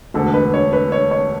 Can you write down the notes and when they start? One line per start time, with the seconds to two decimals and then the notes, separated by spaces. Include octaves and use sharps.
0.14 E1 D2 D3 A4
0.34 B4
0.54 C#5
0.73 B4
0.92 C#5
1.11 C#5